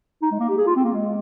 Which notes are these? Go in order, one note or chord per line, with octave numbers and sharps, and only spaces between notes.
D#4
G#3
A#3
G4
G#4
F4
C4
A#3
G#3